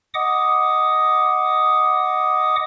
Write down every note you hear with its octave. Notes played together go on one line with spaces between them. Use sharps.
D#5 F#5 D6 D#6